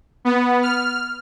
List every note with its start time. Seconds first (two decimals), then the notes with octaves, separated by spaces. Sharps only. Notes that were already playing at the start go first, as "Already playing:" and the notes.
0.25 B3
0.62 F6